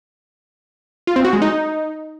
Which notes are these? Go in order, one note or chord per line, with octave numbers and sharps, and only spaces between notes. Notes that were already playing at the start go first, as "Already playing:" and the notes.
F4
C4
F#4
G#3
D#4